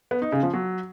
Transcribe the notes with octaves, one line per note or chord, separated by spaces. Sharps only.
B3
D#4
C#3
F3
F#3